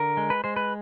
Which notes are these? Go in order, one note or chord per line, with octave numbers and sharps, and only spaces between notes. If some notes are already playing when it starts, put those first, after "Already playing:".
Already playing: D3 A#4
G#3
B4
G#3 C5
B4